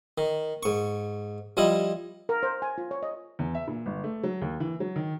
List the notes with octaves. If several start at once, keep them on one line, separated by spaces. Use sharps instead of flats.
D#3
G#2 C#6
F3 G3 E4 D#5
A#4
C5
G#5
F4
C#5
D#5
E2
E5
A#2
G1
A3
F#3
D#2
E3
F#3
D#3